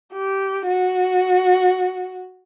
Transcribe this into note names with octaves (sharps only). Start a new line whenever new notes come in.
G4
F#4